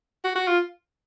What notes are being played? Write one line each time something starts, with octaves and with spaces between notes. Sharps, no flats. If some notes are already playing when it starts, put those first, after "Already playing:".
F#4
F#4
F4